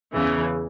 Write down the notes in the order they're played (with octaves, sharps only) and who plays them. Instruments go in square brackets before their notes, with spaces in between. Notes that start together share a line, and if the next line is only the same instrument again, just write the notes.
[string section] E2 C#3 E3